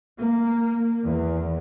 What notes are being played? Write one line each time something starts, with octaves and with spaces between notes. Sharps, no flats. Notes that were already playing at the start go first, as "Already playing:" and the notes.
A#3
E2